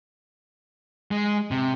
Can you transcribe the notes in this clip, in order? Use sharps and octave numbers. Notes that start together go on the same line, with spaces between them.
G#3
C3